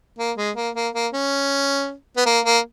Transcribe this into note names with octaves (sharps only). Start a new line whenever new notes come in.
A#3
G#3
A#3
A#3
A#3
C#4
B3
A#3
A#3